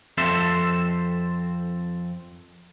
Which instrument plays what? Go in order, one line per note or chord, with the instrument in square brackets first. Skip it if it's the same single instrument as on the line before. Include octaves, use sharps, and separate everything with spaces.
[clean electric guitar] F2 C4 A4 C5 E5